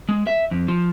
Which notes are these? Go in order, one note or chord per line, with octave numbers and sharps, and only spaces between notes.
G#3
E5
F2
F3